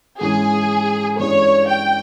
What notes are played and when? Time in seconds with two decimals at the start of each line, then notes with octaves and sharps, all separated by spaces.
0.20 G#2 E3 G#3 C#4 G#4
1.19 G2 E3 G#3 C#4 G#4 C#5
1.69 G5